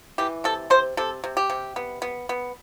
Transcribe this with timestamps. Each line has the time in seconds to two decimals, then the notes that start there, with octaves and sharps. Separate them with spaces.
0.18 E3 G4
0.44 C3 A4
0.70 C3 C5
0.97 C3 A4
1.24 C3
1.37 G4
1.50 C3
1.76 B3
2.02 B3
2.29 B3